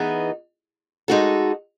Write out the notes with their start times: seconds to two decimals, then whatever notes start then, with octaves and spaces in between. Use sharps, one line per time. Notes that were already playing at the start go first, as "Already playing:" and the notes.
Already playing: E3 B3 D#4 G#4
1.08 G#3 D#4 F#4 A4